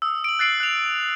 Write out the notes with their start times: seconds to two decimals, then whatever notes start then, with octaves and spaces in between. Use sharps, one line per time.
0.02 D#6 E6
0.24 D7 F#7
0.39 F#6 A6 C7 D7 F#7
0.60 F#6 F7